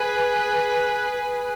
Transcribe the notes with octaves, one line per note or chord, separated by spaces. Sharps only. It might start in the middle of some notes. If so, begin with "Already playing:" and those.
Already playing: G#4 B4